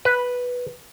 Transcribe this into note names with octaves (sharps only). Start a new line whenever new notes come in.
B4